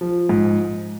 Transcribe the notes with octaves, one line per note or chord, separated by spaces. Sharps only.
F3
G#2